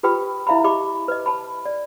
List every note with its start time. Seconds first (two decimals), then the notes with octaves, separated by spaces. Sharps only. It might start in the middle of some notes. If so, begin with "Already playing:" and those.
0.03 F4 G4 B4 G5 B5 D#6
0.47 E4 E5 F5 A#5 B5
0.64 G4 D#5 B5 D6
1.08 B4 D#5
1.26 A5 B5
1.66 D5